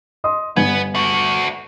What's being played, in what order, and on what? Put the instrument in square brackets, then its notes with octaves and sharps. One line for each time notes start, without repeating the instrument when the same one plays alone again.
[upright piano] D#5 C6 D#6
[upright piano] G1 G#5 G#6 [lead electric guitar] B3
[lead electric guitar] A3 F#4